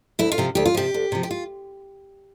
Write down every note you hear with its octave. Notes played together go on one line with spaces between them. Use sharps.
D2 E4
F4
C3 F3
D2 G4
F4
C3 F3 G4
D2
C3 F3
G4
F4